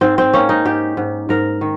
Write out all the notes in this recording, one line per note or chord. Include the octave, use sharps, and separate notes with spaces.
G#2 C4
C4
A#3 C#4
D#4
G#2 G4
G#2
G#2 A#4
D#3